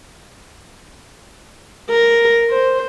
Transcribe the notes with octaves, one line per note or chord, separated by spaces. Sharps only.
A#4
C5